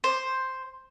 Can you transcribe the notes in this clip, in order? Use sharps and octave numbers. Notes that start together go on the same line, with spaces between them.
C5